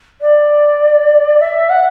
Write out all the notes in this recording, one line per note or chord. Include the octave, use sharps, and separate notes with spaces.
D5
E5
F#5